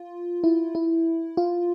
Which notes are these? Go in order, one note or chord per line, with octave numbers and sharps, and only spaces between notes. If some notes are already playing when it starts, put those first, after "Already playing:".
Already playing: F4
E4
E4
F4